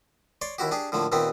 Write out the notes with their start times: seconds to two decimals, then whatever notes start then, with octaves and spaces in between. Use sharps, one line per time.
0.42 C#5 D5 C6
0.58 D#2 E4 F#4 G4
0.71 D4 G4 G#4
0.92 A2 D3 F3 A#3
1.12 D#2 A#2 B3 C4 G4